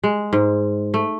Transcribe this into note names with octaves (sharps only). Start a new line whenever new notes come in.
G#3
G#2
A3